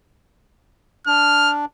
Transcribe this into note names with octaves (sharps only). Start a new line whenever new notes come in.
D4 F6